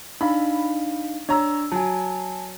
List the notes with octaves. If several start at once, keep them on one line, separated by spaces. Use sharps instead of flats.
D4 D#4 F5 B5
D4 C#5 A#5 E6
F#3 G#5 A5